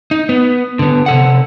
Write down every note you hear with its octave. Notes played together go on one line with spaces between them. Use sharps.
D#4
B3
D3 B3
C3 A4 F#5